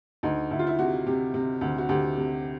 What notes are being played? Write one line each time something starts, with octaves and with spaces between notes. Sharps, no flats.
D2 D#4
D2 E4
F4
E4
C3 F#4
C3 G4
C3
D2
F#4
D2 G4
C3